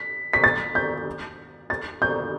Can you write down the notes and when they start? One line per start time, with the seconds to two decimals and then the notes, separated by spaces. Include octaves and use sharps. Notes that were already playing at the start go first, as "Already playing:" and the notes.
Already playing: B6
0.33 B6
0.44 A6
0.75 G6
1.70 A6
2.02 G6